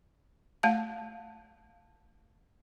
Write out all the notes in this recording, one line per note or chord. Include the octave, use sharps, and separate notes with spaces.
A3 F5 A5